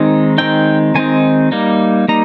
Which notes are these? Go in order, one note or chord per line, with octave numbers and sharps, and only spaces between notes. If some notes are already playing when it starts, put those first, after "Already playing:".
Already playing: D#3 G#3 C4 D#4
D#3 G#3 C4 D#4 G5
D#3 G#3 C4 D#4 G#5
G3 A#3 D#4
G3 A#3 D#4 A#5